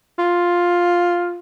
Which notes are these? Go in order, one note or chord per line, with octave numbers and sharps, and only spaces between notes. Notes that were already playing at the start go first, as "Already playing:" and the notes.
F4